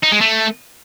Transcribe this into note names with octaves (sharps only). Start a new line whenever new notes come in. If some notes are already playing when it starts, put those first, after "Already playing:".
D#4
G#3
A3